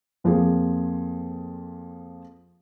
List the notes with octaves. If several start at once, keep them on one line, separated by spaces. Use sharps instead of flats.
F2 F3 A#3 G#4